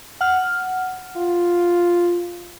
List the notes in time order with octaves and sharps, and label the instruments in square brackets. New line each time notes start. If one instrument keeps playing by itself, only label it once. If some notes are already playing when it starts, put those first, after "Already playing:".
[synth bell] F#5 F6
[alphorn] F4